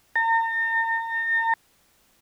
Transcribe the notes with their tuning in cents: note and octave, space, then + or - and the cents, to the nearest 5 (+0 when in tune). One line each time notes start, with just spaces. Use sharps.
A#5 -40